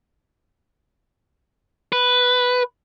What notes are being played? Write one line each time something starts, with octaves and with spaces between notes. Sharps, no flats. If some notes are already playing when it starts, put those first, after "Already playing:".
B4